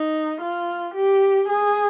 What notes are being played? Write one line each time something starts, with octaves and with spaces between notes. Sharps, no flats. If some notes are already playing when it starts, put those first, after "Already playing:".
Already playing: D#4
F4
G4
G#4